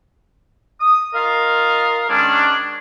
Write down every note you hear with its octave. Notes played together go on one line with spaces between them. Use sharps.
D#6
F4 A#4 D#5 F5
D#3 G#3 C#4 D4